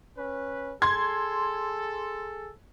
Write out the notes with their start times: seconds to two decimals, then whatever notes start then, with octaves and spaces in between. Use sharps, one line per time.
0.17 C#4 B4
0.82 G#4 A4 C6 G#6